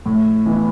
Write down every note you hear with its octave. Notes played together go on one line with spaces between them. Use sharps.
A2
E3 B3 E4